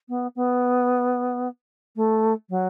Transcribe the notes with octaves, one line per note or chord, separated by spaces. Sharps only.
B3
B3
A3
F#3